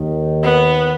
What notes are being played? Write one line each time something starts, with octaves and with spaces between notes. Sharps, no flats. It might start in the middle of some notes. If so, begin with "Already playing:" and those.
Already playing: D#2 D#3
B3